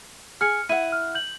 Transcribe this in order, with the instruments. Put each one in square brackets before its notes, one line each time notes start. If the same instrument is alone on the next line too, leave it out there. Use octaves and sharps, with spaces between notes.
[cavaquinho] G#4 G#5 [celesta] F6 C#7
[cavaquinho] E4 F#5 [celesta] D#7
[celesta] F6
G6 F#7